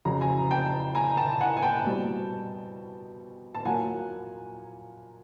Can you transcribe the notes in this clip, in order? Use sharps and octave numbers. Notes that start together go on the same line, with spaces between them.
F2 C#3 F#3 A#5
G#5 A#5
G5 A5
G#5 A#5
G5 A5
F#5 G#5
G#5
G5 A5
B2 G3 C4
A5
A#2 F#3 A#3 F#5 G#5